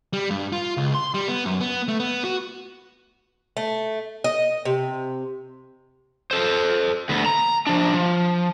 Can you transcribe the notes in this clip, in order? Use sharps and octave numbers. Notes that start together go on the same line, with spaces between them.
G3
G2
F4
C#2
C6
G3
B3
F#2
B3
A3
B3
F#4
A3
D#5
C3
A4 C5
D2 B3
A#5
F3 D4
F3